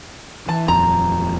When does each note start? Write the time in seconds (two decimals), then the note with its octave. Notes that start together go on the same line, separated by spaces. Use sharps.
0.49 E3 A5
0.68 D#1 F2 A#5